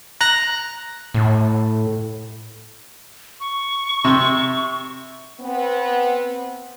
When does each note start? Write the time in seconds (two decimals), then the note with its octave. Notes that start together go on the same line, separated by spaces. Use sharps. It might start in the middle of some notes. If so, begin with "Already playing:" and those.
0.21 A#5 F#6 A#6
1.14 A2
3.40 C#6
4.04 C3
5.41 B3 C4